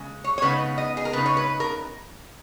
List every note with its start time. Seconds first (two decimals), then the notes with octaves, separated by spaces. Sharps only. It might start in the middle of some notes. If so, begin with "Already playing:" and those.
Already playing: C#3 G#3
0.24 C#5
0.38 C#5
0.42 C#3 G#3 B3 D#4 B4
0.78 D#5
0.97 G#4
1.05 A#4
1.13 C#3 G#3 B3 D#4 B4
1.26 C#5
1.37 B4
1.60 A#4